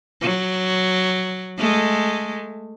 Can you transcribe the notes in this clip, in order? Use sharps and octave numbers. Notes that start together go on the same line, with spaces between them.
F#3
G#3 A3